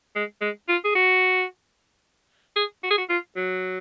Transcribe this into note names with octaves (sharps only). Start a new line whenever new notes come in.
G#3
G#3
F4
G#4
F#4
G#4
F#4
G#4
F#4
F4
F#3